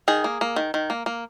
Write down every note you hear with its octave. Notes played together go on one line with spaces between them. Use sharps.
D#3 G#4
A#3
A#3
D#3
D#3
A#3
A#3